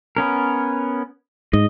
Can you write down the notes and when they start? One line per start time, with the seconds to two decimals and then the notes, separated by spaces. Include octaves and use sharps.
0.17 B3 C#4 A#4
1.53 G#2 D#5